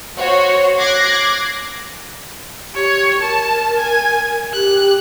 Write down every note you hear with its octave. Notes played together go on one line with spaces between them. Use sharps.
F#4 C5 C#5
D6 F#6 G#6 A#6 C7
G4 C#5
A#4 A5
G#5
G4 F#6